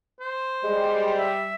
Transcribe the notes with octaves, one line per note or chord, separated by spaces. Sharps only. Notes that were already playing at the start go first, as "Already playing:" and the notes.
C5
G3 G#3
E5